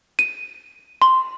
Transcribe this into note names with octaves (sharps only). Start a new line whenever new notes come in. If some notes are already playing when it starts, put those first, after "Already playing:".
D#7
C6